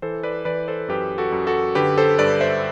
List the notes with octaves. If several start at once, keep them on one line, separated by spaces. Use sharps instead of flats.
E3 A4 C5
B4 D5
E3 B4 D5
A4 C5
F#2 G4 B4
F#4 A4
F#2
F#4 A4
D3 G4 B4
A4 C5
G2 B4 D5
C5 E5